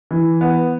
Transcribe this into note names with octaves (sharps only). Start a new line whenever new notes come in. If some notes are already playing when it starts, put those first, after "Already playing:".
E3
B3